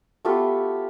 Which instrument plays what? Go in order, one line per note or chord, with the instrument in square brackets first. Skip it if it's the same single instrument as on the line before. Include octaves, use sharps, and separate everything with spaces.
[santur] A3 B3 F4 G4